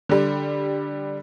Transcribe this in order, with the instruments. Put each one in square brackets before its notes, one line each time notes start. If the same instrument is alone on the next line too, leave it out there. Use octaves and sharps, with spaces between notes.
[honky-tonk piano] D3 G3